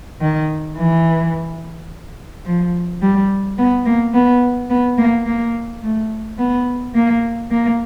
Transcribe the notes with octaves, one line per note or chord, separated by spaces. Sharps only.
D#3
E3
F3
G3
B3
A#3
B3
B3
A#3
A#3
A3
B3
A#3
A#3